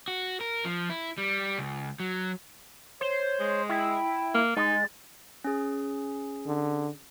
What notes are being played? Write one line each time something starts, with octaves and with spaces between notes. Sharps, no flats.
F#4
A#4
F3
E4
G3
C#2
F#3
C5 C#5
G#3
E4 G5
A#3
G#3 D#4 A6
C#4 G#4
D3